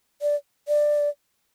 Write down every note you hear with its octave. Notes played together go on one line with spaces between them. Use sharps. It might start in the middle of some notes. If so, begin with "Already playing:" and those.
D5
D5